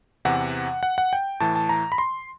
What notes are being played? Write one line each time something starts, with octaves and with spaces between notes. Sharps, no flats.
E2 C3 E3 F#5
F#5
F#5
G5
A2 E3 A5
A5
A#5
B5
C6